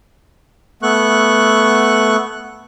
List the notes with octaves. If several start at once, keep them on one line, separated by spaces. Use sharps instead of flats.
A3 B3 C#6 F#6